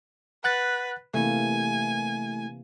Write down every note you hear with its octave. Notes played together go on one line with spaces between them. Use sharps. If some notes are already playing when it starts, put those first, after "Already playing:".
B4 F#5 F#6 A6
C3 E3 A3 A#3 E4 G#5